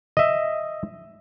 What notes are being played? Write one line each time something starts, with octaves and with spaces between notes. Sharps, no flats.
D#5 E5